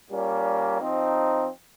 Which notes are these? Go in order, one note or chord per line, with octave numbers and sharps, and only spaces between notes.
A#2 G3 A#3 C#4
F3 C4 D#4